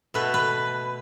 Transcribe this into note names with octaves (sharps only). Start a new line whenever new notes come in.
B2 A3 B4
B4